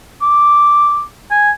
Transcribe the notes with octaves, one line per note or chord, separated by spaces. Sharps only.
D6
G#5